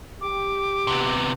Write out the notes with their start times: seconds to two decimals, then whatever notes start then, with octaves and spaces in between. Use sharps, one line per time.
0.21 G4 D6
0.87 C3 B3